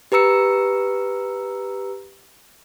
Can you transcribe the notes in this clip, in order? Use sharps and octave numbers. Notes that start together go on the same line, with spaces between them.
G4 B4 A#5 E6 C#7